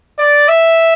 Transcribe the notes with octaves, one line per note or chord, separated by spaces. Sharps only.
D5
E5